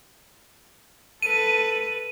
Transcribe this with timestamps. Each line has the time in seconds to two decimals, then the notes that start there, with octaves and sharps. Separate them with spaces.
1.22 A4 B4 D#7